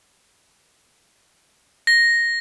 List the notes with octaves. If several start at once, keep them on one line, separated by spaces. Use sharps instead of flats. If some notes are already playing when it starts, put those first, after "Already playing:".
A#6